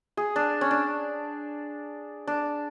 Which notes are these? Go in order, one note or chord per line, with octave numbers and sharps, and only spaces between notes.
G#4
D4
C#4
D4
D4